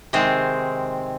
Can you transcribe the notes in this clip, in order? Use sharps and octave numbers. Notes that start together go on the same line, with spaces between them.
C3 D#3 G#3 C4